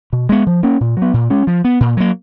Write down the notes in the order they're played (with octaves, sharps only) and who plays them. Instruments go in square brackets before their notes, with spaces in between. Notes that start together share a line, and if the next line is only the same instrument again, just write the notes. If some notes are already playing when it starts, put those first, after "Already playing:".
[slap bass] B2
G#3 B3
F3
A#3 C#4
A#2
F#3 B3
A#2
G#3 C#4
F3
B3
A#2
F#3 A#3